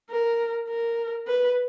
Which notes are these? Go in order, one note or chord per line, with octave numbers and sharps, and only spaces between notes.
A#4
A#4
B4